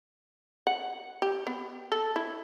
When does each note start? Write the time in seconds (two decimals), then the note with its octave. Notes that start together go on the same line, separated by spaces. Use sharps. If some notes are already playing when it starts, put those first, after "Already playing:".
0.67 F#5
1.22 G4
1.47 B3
1.92 A4
2.16 E4